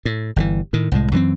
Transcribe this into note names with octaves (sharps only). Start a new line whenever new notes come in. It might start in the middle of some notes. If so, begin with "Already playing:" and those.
A2
G1 C#3 E3
A2 D#3
C2 A2 G#3
F#2 E3 G3 C4